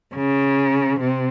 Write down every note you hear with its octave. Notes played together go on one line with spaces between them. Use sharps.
C#3
C3